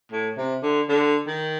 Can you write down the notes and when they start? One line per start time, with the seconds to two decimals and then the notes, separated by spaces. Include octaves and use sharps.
0.12 A2
0.37 C3
0.62 D3
0.89 D3
1.27 D#3